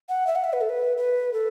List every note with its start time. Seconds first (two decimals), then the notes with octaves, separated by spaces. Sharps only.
0.09 F#5
0.27 E5
0.35 F#5
0.44 E5
0.53 B4
0.61 A4
0.69 B4
0.97 B4
1.33 A4